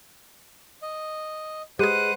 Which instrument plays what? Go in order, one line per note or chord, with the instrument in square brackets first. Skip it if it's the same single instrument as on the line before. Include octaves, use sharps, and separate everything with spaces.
[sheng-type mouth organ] D#5
[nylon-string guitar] G#3 [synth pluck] G4 G#4 [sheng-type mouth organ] B4 C5 F#5 [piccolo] D#7